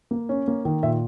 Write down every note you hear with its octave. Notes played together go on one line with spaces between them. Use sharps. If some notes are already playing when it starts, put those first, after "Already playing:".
A#3
C#4
A#3
D#3
A#2 E5